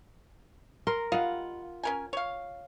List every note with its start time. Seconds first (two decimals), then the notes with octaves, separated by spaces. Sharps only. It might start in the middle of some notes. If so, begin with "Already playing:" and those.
0.87 A#4 C6
1.12 G3 F4 D#5 F5 F#5
1.83 C#4 A#4 G#5
2.13 C#5 F5